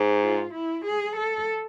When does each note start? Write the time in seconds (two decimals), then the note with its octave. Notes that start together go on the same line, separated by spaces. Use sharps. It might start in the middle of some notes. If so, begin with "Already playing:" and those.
Already playing: G#2
0.22 F4
0.54 E4
0.85 G#4
1.16 A4